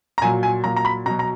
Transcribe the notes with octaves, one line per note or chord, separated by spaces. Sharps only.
A#5
A#2 F#3 G#5
G#5
A#2 F#3 A#5
A#5
B5
B2 F#3 A#5
A#5